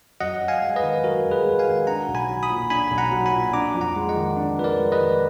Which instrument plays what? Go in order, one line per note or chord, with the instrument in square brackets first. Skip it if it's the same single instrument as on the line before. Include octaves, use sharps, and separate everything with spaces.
[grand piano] F#2 [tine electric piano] D#5 F#5
[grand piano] F#2
[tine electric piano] F5 G#5
[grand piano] G#3
[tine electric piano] B4 D#5
[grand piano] D#3
[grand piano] F#2 [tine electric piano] F#4 A#4
[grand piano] F#2
[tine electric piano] G#4 B4
[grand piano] G#3
[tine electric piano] F5 G#5
[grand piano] D#3
[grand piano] D4 [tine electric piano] F#5 A#5
[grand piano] B1
[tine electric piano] G#5 B5
[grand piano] F#3
[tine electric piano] B5 D#6
[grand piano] A#2
[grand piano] D4 [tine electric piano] G#5 B5
[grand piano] B1
[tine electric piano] F#5 A#5
[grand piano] F#3
[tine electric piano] G#5 B5
[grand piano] A#2
[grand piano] D4 [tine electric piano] A#5 D6
[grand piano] F2
[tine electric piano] F#5 A#5
[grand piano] G#3
[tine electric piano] D#5 F#5
[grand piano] D#3
D4
[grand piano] F2 [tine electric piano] B4
[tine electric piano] A#4 D5
[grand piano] G#3
[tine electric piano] B4 D#5
[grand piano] D#3